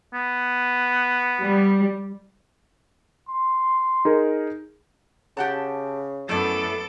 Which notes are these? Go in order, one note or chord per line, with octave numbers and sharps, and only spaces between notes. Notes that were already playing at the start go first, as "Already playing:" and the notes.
B3
G3
C6
D#4 G#4 A#4
C#3 G4 F#5 A5
F#2 A3 B3 E4 A4 D5 D7